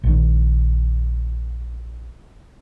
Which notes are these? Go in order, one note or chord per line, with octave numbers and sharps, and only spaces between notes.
A#1 D#3